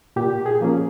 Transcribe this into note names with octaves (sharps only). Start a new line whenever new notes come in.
A#2 G4
G#4
F3 A#3 C#4